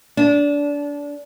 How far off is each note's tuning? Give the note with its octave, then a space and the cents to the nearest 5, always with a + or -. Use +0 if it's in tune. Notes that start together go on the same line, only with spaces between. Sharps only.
D4 -25